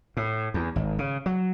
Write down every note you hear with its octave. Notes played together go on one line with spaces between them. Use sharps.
A2
E2
G#1
C#3
F#3